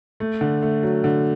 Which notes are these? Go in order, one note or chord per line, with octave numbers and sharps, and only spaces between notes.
A3
D3
A3
F#3
D3